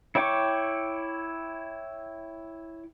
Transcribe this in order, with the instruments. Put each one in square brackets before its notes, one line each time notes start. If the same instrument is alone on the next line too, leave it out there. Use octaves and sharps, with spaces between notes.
[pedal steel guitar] E4 C#5 G5 C#6 D6